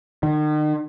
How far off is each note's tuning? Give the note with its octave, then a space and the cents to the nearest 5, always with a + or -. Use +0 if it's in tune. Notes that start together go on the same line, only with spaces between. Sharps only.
D#3 -40